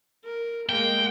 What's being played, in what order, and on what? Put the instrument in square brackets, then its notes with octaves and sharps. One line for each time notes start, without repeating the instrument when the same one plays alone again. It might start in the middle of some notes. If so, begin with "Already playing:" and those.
[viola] A#4
[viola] G#3 A#3 [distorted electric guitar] G5